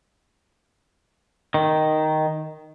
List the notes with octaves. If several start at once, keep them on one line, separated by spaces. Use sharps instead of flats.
D#3